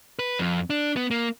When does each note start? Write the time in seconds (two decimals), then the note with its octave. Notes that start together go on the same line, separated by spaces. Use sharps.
0.19 B4
0.39 F2
0.70 D4
0.96 B3
1.11 A#3